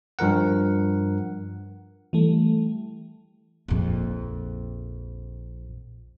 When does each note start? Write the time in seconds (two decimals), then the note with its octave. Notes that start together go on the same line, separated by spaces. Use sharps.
0.19 G2 F3 A#4 F#5
2.13 E3 G3 A3
3.68 A#1 F2